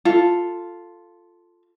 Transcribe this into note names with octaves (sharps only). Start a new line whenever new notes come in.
F4 A4